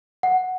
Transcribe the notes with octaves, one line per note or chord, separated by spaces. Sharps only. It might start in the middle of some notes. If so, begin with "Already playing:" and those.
F#5